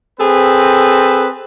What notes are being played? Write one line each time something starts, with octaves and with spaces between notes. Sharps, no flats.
C4 G#4 A4 B4